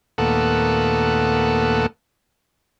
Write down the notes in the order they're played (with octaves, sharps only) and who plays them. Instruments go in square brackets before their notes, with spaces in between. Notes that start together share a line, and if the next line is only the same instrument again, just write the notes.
[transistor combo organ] D#2 A#2 A3 B3 A4 F#5